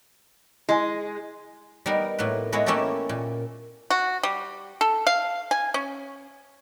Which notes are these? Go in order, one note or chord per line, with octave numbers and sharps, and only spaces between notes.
G#3 E4 D#5 G#5
G3 B3 D#4 A#4
A2 A#3 B3 B4
G#3 B3 E4 F#4 C#5
A3 A#3 C#4 E4 G4 A4
A#2
F#4
G3
A4
F5
G#5
C#4